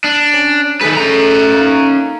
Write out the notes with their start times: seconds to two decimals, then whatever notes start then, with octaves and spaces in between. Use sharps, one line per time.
0.04 D4
0.33 C#4
0.81 D#3 A3 G#4 B4
0.96 C#4 A#5
1.52 A#3 D#4